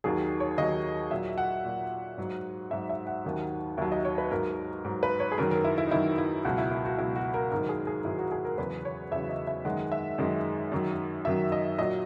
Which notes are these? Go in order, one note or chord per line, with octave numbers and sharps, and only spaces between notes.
D#2 D#3 F#3 G#4
C#5
D#2 D#3 F#3 D#5
A#2 F#3 E5
F#5
A#2 F#3
G#2 F#3
G#2 F#3 E5
E5
F#5
D#2 D#3 F#3
D#2 D#3 F#3 E5
D#5
C#5
B4
G#2 F#3 A#4
G#2 F#3
B4
C#5
G#4
F#2 D#3 F#3 A#4
A#4
E4
E4
D#4
F#2 D#3 F#3 E4
E4
C#2 B2 F#3 F#4
E4
E4
F#4
C#2 B2 F#3 E4
F#4
A#4
G#2 D#3 F#3 A#4
G#4
G#4
G#2 D#3 F#3 E4
F#4
G#4
A#4
E2 C#3 F#3 B4
C#5
E2 C#3 F#3 E5
D#5
E5
F#2 D#3 G#3 F#5
E5
F#2 D#3 G#3
F#2 D#3 F#3
F#2 D#3 F#3 E5
D#5
A#2 F#3 D#5